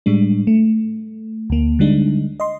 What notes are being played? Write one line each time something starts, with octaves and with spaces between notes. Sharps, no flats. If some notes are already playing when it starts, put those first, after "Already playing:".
A2 G3 G#3 D4
A3
D2 A#3
D3 G3 G#3 D4 D#4
D#5 C6